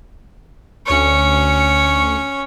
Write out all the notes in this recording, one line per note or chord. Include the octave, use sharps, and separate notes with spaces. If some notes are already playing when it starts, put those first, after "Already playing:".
D2 C#4 C#5 C#7